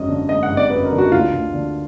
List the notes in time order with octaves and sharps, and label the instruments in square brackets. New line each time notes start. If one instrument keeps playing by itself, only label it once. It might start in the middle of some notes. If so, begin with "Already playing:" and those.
Already playing: [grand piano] G#1 F#2 G#3 D#5
D3
G#3 D#5
F#5
G#1
D5
F#2 B4
A#4
D3
F#4
D2 F4
D2
D3